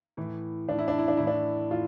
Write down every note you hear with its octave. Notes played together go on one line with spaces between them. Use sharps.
A2 E3
A2 E3 D4
E4
D4
E4
D4
A2 E3 E4
D4
A2 F4